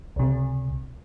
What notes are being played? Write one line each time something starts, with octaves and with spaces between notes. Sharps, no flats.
C#2 C3